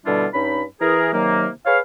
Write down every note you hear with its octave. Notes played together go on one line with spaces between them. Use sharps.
B2 D3 G3 D4 E4 F4
G2 C#4 D#4 B5
E3 G#4 A#4
C3 D#3 F#3 A#3
G#4 B4 C#5 F5